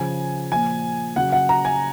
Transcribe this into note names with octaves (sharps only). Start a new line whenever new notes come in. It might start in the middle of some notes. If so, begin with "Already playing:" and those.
Already playing: C#3 F3 G#5
A#2 F3 G#5
C#3 F#3 F#5
F#5
A#5
G#5